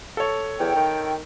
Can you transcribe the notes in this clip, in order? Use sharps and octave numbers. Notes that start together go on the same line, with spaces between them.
A4 C#5
E2 G5
D#3